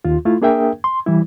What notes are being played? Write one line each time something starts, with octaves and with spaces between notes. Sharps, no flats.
D#2 F4
A3 E4 F4
A#3 D4 G#4 A#4 E5 G5
C6
E3 G3 E4